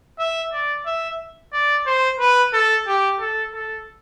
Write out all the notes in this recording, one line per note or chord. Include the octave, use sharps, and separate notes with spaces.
E5
D5
E5
D5
C5
B4
A4
G4
A4
A4